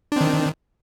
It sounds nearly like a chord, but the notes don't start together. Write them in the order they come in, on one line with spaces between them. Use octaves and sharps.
D4 C4 D#3